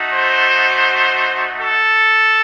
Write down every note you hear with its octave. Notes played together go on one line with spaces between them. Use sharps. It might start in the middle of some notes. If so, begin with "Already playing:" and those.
Already playing: A3 D#4 F#4
C5
A4